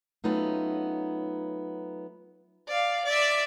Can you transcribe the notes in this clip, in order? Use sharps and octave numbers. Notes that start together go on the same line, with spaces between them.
F#3 A3 B3 C#4 D#4 F4
D5 F5
D5 E5